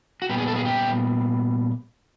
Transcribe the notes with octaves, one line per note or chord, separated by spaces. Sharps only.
F#4
A#2 G3 B3 G4
G#4
A4
G#4
G4